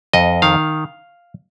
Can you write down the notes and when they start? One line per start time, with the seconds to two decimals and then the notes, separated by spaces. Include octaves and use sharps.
0.13 F2 D#5
0.42 D#3 F5